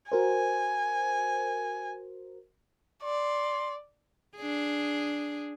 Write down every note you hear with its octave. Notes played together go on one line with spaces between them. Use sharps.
F#4 A#4 C5 G#5
D5 C6
D4 G#4